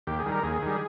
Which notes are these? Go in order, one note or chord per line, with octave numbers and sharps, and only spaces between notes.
D#2 G4
G#4
D#3 G3
A#4
D#2 G#4
D#3 G3